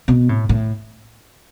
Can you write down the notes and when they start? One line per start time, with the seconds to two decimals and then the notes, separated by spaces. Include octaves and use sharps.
0.08 B2
0.29 A2
0.49 A2